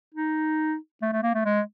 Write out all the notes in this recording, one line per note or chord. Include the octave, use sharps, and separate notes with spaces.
D#4
A3
A3
A#3
A3
G#3